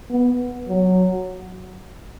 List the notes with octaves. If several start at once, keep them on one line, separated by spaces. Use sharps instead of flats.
B3
F#3